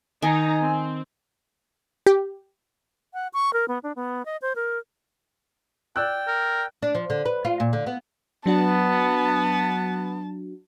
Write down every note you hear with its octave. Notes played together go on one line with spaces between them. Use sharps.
D#3 D#4 G#5 A#5
C4
G4
F#5
C#6
A#4
B3
D4
B3
D#5
C5
A#4
D5 G5 E6 F#6
A#4
D4
F3
D3
B4
F4
A#2
D3
B3
F#3 B3 D4 F#4 A5